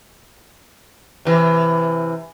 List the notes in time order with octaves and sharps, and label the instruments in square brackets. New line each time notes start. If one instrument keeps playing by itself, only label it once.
[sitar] C3 E3